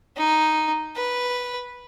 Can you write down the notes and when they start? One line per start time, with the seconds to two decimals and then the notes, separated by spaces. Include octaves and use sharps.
0.17 D#4
0.96 B4